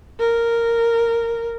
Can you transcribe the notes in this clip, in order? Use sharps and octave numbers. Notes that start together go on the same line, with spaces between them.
A#4